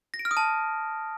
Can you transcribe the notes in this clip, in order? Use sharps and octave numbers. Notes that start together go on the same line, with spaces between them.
A#6
D7
F6
D#6
A5